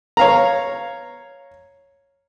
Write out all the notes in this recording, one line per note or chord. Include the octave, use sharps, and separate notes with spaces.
C#5 F5 A#5